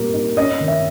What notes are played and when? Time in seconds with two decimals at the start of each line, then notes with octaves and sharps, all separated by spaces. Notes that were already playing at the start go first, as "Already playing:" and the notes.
Already playing: A#2 G3 A#3
0.13 D#4
0.37 C#4 D#5
0.60 D#3
0.68 E5